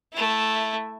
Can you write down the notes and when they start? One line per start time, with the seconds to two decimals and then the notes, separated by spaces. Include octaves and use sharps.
0.13 A3 E4